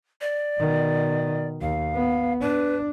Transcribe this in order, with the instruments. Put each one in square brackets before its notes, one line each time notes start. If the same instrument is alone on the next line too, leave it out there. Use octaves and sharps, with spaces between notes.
[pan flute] D5
[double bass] B2 D#3
[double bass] D#2 [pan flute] F5
[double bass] B3
[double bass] D4 [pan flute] B4